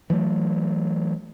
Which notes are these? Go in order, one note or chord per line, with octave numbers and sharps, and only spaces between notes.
E3 F#3 A3